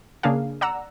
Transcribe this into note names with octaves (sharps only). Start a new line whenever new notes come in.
C#3 A#3 D4 G#4 F5
D5 F#5 A#5 E6